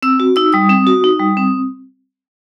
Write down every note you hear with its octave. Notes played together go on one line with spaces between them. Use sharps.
C4 E6
F#4
D#4 E6
G3 D#6
C4
F#4
D#4
G3
C4